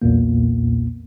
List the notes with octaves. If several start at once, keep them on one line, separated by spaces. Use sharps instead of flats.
B1 E2 A#2 A#3